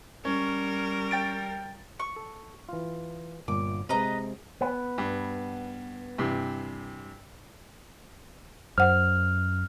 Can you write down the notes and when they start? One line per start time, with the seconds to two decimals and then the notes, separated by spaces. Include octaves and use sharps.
0.25 G3 C#4 A#4
1.11 G5 A6 D7
2.00 C#6
2.16 A4
2.69 E3 F4
3.48 G1 A#2 D6
3.89 C3 G#3 B4 D#5 A#5
4.61 B3
4.98 G2
6.18 G2 C3 E3
8.78 F#2 C5 F#5 F6